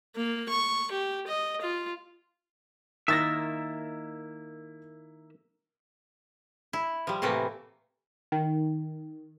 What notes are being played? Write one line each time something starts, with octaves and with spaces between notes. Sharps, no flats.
A#3
C#6
G4
D#5
F4
D#3 A#3 E4 E5 E6 A6 A#6
E4
F3 G3
A2 C3 E3 A3 A#3
D#3